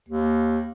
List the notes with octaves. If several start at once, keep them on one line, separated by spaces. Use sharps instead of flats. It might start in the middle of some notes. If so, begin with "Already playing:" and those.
D#2